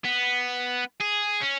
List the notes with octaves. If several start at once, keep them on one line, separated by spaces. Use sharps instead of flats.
B3
G#4
C#4